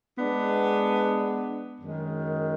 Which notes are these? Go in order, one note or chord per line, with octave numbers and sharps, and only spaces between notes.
G#3 B3 D4
F#2 D#3 G#3